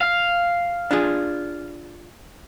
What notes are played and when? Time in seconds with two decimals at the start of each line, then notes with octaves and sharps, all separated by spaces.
0.01 F5
0.91 D4 F4 G#4